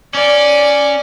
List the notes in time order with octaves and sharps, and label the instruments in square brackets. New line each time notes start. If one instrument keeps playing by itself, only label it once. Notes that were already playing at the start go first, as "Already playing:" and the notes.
[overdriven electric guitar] C#4 [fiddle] D5